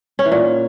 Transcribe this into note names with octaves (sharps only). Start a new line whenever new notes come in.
C#4
E3
A#2